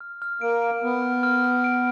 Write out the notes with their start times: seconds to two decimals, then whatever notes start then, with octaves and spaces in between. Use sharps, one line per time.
0.01 F6
0.22 F6
0.41 A#3 D7
0.62 D7
0.83 B3 F6
1.02 F6
1.23 F6
1.44 F6
1.64 D7